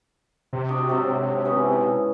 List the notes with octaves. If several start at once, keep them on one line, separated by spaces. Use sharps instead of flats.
C3
D4 F#4 D#5
G#2 F#3 A4
E3 B3 C#4